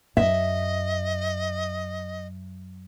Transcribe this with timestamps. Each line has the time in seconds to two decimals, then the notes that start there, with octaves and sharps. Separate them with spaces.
0.17 F#2 D#5 E5